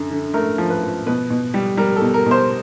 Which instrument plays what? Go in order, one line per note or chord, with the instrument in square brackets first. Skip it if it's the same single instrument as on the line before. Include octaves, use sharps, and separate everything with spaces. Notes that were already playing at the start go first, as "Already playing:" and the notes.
Already playing: [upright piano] F#2 D3
D3
A3 A#4
F3
B4
F3
B2 B4
B2
G3
G3 A#4
A4
B2
A#4
B2 C5